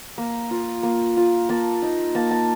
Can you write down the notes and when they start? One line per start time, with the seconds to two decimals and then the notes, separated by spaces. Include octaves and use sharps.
0.18 A#3
0.51 F4
0.83 A#3
1.17 F4
1.49 A#3 A5
1.82 D#4
2.15 A#3 A5
2.31 A5